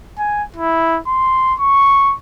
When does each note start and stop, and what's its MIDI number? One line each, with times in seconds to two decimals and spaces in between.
0.18 0.43 80
0.56 1.00 64
1.07 1.54 84
1.60 2.15 85